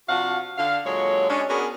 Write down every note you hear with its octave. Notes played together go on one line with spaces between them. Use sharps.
C3 F3 D4 F#4 F5 F#5
D3 F5
A#2 D3 F#3 G#3 C#5
G#3 C#4 D4
B3 C#4 D4 F#4 G#4 A#4